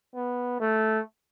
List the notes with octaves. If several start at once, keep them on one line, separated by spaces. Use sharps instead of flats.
B3
A3